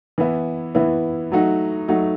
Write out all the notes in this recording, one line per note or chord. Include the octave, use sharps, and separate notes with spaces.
E3 B3 E4
E3 B3 E4
F#3 A3 D#4 F#4
F#3 A3 D#4 F#4